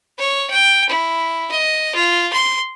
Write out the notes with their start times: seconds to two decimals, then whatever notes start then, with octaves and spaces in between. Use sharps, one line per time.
0.18 C#5
0.50 G5
0.89 E4
1.51 D#5
1.95 F4
2.33 C6